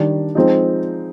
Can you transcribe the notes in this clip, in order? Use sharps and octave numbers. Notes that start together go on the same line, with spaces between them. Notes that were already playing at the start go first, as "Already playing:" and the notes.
Already playing: D#3 G3 D4
F3 G#3 C4 D#4